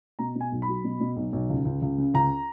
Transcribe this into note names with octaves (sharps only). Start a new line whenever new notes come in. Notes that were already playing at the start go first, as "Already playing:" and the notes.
B2 A#5
B2
G#5
B1
B5
F#3
B2
B2
B1
B1
C#2
C#2
C#2
C#3
C#2 A#5